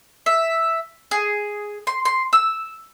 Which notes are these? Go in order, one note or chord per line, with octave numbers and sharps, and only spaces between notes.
E5
G#4
C6
C6
E6